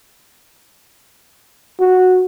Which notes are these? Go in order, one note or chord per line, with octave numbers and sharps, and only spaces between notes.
F#4